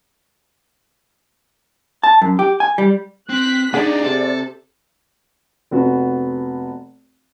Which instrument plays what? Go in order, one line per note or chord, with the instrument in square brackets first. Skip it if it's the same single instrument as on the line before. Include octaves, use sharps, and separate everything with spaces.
[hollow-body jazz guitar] A5
F#2
G4
G#5
G3
[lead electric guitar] C4 [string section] F#6 B6
[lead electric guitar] D4 D#5 [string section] D#4 [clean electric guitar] G#4 F#5 [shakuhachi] D5
[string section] C3 [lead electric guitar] A4
[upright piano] F1 B3 F#4